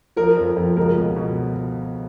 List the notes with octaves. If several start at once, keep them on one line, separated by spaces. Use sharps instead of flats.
F3 A#4
F2
F2
C#2 A#4
B2
B2